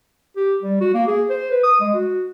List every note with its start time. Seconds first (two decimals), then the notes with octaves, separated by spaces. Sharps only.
0.36 G4
0.62 G3
0.81 F#4
0.94 A#3
1.07 G#4
1.29 C5
1.51 B4
1.63 D#6
1.80 G#3
1.94 F#4